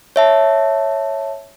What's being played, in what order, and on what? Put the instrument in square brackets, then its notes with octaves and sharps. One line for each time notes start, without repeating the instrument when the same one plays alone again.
[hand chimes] C#5 E5 A5